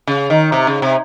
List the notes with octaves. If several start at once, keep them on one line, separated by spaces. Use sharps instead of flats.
C#3
D#3
C3
C#3
C3